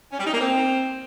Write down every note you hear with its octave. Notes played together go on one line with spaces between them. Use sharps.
C#4
G3
D#4
A#3
C4